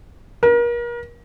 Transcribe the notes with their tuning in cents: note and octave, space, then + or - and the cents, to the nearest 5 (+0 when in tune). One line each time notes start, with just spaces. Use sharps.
A#4 +35